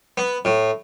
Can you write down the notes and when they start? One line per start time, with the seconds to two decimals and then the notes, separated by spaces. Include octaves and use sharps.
0.17 B3
0.45 A2